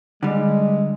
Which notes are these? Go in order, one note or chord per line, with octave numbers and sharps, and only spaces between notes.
D3 G3 G#3